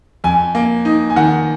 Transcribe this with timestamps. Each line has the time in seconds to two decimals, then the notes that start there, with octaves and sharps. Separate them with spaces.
0.24 F2 G#5
0.55 A#3
0.85 D#4
1.10 G#5
1.16 D#3 F#5